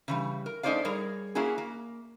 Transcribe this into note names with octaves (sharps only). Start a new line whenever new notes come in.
C#3 E3 G3
A#4
A3 C#4 D#4 C5 D5 F5
G3 G#4 A#4 C#5
A#3 C#4 E4 F#4 G#4
A#3